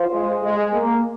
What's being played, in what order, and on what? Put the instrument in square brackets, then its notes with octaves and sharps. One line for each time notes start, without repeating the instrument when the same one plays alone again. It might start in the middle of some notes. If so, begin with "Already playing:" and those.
Already playing: [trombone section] F4 C5
[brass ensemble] G#3
G#3
A#3